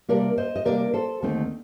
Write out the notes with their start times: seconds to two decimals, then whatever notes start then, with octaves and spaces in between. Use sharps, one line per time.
0.09 C3 G3 A#3 D4 A#4 D5
0.38 C5 D#5
0.56 D#5
0.65 C3 G3 A#3 D4 A#4 D5
0.94 A4 C5
1.22 D#2 D3 A3 C4 D#4